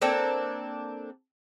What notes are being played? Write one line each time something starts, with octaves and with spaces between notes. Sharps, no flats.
A#3 C4 D4 A4